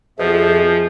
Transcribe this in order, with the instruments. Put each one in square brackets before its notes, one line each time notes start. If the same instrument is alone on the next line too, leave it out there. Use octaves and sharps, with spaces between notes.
[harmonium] F2 E5 [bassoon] B2 [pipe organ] F3 [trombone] G#4